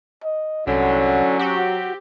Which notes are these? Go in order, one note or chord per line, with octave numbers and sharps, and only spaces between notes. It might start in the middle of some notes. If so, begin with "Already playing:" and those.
D#5
C2 A2 D3 F#3 C#4
C4 F#4 G4